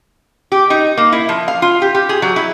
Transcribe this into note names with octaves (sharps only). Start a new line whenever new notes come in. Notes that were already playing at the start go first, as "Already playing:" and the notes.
G4
D#4
A#3
E4
F3
F5
F4
G4
G4
G#4
F#3
E4